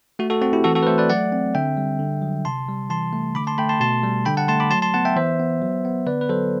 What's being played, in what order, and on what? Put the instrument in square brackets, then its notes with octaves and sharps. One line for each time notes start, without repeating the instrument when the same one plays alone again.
[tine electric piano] A3 F#4
F#4 A4
C4 F#4
E4 G4
E3 F#4 A4
F#4 A4
B4
A3 A4 C5
B4 D5
F#3 D5 F#5
C4
D3 E5 G5
G3
D3
F#3
C3 A5 C6
G3
E3 A5 C6
A3
D3 B5 D6
A5 C6
A3 G5 B5
A5 C6
B2 A5 C6
G3
D3 G5 B5
F#5 A5
A3 A5 C6
B5 D6
F#3 A5 C6
A5 C6
B3 F#5 A5
E5 G5
E3 C5 E5
B3
F#3
B3
D3 B4 D5
B4
F#3 A4 C5